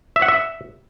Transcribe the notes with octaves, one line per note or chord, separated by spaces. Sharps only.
E5
F#5
E5